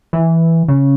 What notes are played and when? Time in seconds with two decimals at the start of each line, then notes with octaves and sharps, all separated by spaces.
0.13 E3
0.68 C#3